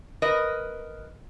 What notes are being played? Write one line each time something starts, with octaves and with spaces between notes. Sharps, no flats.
A#4 B4 D#5